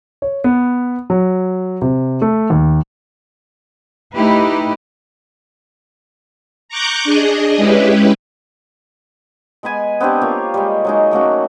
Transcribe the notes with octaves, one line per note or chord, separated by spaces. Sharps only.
C#5
B3
F#3
C3
A3
D#2
A3 D#4 E4 G4 B4
A#5 C#6 D6 F#6 G6
D4 G#4 D#5
G#3 C#4 E4 G4 B4
G#3 B3 B4 G#5
B3 C4 D4 G4
A#3 F4 C#5 F5
G3 G#3
F#3 G#3 D#4
A3 A#3 C#4 F#4